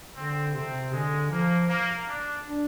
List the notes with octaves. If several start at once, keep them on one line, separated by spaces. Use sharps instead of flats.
D3 C4
C3 C4
D3 G#3
F3 A#3
A#3
D4
D4